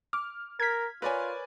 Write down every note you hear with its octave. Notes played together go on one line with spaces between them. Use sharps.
D6 F6
A#4 G#6 B6
F4 A#4 B4 C#5 D5 G#5